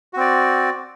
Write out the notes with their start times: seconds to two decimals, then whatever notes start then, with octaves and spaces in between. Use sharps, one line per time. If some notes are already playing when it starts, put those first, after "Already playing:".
0.13 F#4
0.17 C4
0.20 D5